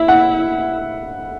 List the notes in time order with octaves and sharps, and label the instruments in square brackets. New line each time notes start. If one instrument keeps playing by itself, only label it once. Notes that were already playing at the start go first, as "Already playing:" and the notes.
Already playing: [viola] E4 [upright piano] E5
[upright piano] F#5